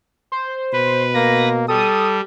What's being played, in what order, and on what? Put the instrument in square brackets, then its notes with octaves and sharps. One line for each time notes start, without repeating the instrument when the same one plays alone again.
[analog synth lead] C5
[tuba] B2 [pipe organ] B4
[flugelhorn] A#3 [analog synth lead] A#6
[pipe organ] G3 [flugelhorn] A4 [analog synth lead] D#6